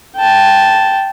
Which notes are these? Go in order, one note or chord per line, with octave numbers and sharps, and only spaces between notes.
G5 A5